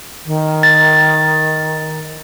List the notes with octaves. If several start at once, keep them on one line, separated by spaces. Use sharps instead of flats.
D#3
A6